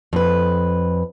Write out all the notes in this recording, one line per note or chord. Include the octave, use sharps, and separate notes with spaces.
F2 B4